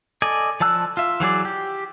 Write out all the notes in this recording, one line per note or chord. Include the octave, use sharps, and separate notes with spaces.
A4 D5 D#5 G#5
F3 D5 A5 E6 F#6
F4 E5
E3 F#3 G#4 D5
G4